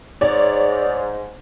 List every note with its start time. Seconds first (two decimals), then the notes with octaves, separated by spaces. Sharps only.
0.21 G#2 C#5 D5